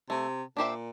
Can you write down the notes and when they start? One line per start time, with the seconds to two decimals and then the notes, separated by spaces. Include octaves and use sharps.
0.10 C3 A3
0.57 A#2 D4 G4 C5 E5